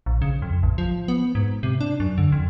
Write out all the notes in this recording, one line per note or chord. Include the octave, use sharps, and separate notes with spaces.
A#1
C#3
F2
A1
F3
B3
G#2
C3
D4
F#2
D3
F2